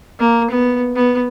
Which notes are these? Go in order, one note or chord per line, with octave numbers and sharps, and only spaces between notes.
A#3
B3
B3